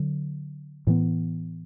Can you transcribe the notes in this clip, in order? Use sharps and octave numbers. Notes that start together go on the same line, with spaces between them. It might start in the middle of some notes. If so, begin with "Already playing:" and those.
Already playing: D3 F#3
A2 E3 B3